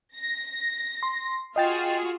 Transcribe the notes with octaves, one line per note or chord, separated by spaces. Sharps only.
A#6
C6
F4 F#4 G#4 D#5 G5 A6